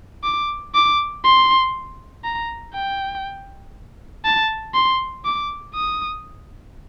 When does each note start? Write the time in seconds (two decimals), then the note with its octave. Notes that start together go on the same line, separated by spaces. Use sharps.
0.23 D6
0.74 D6
1.24 C6
2.24 A#5
2.74 G5
4.24 A5
4.74 C6
5.25 D6
5.75 D#6